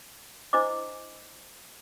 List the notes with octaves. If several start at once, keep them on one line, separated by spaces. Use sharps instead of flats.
D4 E4 C5 D#5 D6